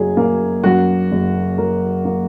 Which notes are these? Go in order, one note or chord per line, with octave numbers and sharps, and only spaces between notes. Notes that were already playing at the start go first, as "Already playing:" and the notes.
Already playing: F#1 F#3 G#4
A#3
F#2 F#4
F#1
F#3 A#4
A#3